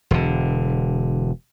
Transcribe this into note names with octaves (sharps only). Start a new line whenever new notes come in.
E1 D3